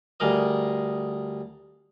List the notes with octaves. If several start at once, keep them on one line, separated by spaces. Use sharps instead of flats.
D2 G3 G#4 A#4 D#5